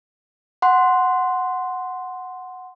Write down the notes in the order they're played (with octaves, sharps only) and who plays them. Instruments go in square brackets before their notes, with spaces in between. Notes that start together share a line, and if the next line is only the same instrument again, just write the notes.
[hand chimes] F#5 C6